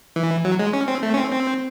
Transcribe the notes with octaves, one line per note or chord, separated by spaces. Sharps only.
E3
F#3
G#3
C#4
C4
A3
C#4
C4
C4